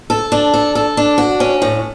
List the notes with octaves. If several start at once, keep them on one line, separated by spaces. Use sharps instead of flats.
A4
D4
A4
A4
D4
F#4
C#4
A2